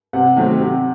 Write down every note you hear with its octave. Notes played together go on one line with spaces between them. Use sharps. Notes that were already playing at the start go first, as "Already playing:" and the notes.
C3 F#5
D#3 F#3 A3 C4
C3